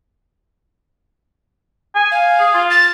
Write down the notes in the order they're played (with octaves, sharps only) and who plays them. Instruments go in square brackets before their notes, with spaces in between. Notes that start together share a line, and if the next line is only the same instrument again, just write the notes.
[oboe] G#5
[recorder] F5
[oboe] G#4
F4
[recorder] A6